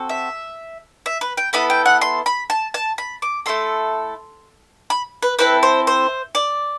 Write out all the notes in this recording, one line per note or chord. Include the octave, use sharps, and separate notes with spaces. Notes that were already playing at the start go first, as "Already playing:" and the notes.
Already playing: C4 F#4 A4
E5
E5
B4
G5
B3 E4 A4 B5
G5
F#5
C6
B5
A5
A5
B5
D6
A3 E4 A4 C6
B5
B4
C4 E4 A4 B4
C5
C5
D5